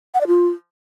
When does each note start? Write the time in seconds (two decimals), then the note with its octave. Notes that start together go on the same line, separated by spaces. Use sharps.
0.14 F#5
0.21 D5
0.27 F4